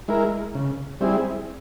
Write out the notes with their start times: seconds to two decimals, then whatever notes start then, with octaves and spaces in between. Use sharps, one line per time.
0.08 G#3 E4 A#4
0.55 C#3
1.01 G3 C4 E4 G#4